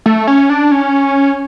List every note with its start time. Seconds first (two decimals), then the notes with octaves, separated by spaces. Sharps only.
0.06 A3
0.27 C#4
0.50 D4
0.72 C#4